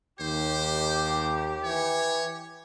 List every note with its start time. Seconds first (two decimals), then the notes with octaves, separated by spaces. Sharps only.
0.20 D#2 G4 C5
1.64 E3 C#5